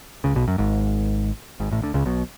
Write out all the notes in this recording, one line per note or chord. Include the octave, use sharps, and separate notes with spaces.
C#2 C#3
B1 B2
F#2
G#1 G#2
G#1 G#2
A1 A2
D2 D3
C#2 C#3
B1 B2